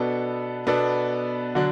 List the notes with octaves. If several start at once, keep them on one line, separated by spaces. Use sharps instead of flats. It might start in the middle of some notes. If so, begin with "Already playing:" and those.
Already playing: B2 B3 D4 A4
B2 B3 D4 A4
D3 F#3 D4